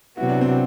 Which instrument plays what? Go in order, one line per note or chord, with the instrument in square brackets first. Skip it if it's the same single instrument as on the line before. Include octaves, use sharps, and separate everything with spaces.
[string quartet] C3 F#3 B3 F#4 [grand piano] E4
[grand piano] D4
C4